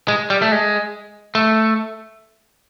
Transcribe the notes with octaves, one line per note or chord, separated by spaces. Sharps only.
G#3
G3
A3
G#3
A3